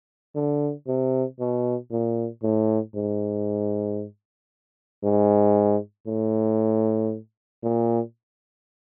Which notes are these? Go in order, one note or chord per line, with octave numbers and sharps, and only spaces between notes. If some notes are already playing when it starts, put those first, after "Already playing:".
D3
C3
B2
A#2
A2
G#2
G#2
A2
A#2